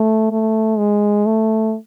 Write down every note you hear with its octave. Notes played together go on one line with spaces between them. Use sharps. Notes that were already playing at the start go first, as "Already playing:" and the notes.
Already playing: A3
A3
G#3
A3